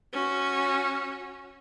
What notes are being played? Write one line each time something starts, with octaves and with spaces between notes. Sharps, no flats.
C#4 F#4